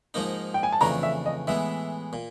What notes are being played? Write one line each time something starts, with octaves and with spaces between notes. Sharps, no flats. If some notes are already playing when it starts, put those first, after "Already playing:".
G#2 F3 A#3 D#4
G5
G#5
A5
F2 C#3 E3 A3 D4 A#5
E5
D#5
A2 E3 G#3 B3 E5
A#2